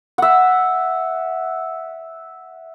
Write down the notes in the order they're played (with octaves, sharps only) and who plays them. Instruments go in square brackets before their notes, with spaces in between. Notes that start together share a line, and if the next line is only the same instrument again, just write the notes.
[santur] E5 F#5